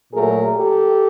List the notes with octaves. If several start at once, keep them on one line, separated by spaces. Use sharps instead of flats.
A#2 F#3 A3 G#4 A#4
G4 A4